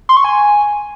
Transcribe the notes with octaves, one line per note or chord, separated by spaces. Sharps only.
C6
C#6
G#5